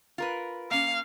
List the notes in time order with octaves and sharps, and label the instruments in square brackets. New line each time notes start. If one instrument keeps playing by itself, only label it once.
[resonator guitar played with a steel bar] F4 A#4 B4
[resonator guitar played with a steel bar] A#3 C#4 [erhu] F5